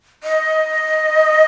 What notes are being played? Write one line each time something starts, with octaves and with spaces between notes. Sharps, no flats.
D#5